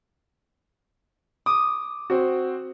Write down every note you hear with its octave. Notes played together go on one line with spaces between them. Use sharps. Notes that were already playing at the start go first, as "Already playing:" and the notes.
D6 D#6
C4 F#4